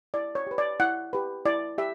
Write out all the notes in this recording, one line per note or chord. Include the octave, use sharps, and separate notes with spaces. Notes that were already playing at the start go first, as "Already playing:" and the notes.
E4 D5
C#5
G4 B4
D5
E4 F#5
G4 B4
E4 D5
G4 E5